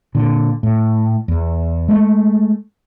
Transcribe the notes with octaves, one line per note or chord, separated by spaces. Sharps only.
A#2 D3
A2
E2
G#3 A3